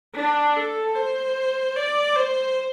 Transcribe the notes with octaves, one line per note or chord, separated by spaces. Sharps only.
D4
A4
C5
D5
C5